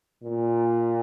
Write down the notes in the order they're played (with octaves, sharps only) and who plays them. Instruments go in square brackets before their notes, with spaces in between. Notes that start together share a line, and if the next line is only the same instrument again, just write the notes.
[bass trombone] A#2